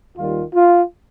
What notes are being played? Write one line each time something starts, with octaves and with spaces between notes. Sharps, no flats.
D#2 D#3 G3 F4
F4